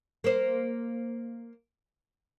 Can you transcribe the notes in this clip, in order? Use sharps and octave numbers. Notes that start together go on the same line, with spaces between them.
A#3 C5